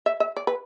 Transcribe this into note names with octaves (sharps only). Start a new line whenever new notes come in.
E5
E5
D5
B4